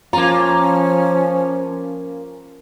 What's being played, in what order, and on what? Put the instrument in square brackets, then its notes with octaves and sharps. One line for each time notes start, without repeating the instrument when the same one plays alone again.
[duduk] F3 [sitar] A#3 F4 [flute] C#4 [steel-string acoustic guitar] A#5